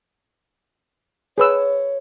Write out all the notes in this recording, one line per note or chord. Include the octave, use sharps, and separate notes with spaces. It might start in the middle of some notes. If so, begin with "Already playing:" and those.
G#4 B4 C#5 E6